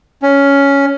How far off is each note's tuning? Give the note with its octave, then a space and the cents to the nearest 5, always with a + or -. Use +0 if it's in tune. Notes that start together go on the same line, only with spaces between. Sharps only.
C#4 +10